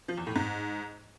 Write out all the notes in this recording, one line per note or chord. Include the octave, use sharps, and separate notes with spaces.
F3
E2
A2
G#2